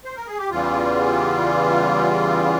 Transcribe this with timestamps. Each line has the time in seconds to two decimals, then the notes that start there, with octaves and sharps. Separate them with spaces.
0.04 C5
0.16 A#4
0.27 G#4
0.38 G4
0.50 E2 C#3 E3 G3 F4